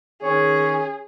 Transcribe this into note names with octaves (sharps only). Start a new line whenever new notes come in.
D#3 C#4 G#4 C#5